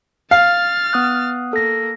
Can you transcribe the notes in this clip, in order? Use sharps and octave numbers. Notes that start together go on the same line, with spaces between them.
F5 F6 A6
B3 D#6 F#6
A#3 A4 A#6